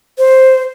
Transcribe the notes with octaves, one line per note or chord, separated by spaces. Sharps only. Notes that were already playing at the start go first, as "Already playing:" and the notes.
C5